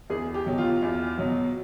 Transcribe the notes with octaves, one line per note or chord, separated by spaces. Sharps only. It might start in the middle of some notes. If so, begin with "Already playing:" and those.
E2 G#4
G4
B2 F#3
F4
E2
B2 F#3